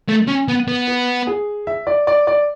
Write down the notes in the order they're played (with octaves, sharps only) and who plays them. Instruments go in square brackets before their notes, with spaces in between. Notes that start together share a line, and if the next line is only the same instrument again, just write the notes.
[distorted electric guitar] A3
C#4
B3
B3
[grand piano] B4
G#4
E5
D5
D5
D5